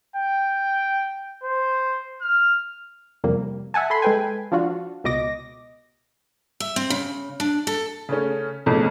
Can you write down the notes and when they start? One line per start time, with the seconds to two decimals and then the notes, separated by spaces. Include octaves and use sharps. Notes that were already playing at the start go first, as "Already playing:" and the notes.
0.16 G5
1.43 C5
2.22 F6
3.24 F2 C3 G3 A#3
3.74 E5 F#5 G#5 A5
3.90 A4 B5 C6
4.02 G#3 A4 B4 G5 G#5
4.52 F3 D4 F4 F#4
5.04 C#2 B2 D#5 D6 A#6
6.60 E5
6.76 C4
6.90 C#3
7.40 D4
7.67 A4
8.09 C#3 A3 C#4
8.66 B1 F2 A2 C#3 E3 A3